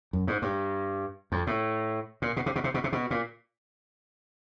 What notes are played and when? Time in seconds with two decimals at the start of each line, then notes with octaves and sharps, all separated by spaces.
0.13 F#2
0.27 G#2
0.42 G2
1.32 F2
1.47 A2
2.22 A#2
2.36 B2
2.46 C3
2.56 B2
2.64 C3
2.74 B2
2.84 C3
2.92 B2
3.11 A#2